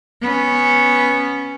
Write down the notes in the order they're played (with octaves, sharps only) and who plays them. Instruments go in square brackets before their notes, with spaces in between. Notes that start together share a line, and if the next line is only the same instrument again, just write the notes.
[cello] B3 C#4